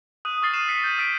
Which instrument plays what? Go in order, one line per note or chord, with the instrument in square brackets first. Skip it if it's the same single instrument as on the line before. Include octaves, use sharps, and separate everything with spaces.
[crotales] D#6 F#6 D#7
C#6 D#6 F6 A6 C7 G7
A6 C7 D#7 E7
E6 B6 C#7
G6 A6
E6 B6 D7